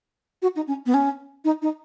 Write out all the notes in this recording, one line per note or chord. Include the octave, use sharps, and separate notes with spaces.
F#4
D#4
C#4
B3
C#4
D#4
D#4